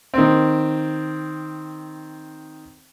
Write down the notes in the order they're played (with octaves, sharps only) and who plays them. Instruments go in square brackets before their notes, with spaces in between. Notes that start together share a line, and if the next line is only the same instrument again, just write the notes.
[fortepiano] D#3 C4